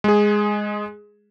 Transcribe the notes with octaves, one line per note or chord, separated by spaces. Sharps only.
G#3 G#4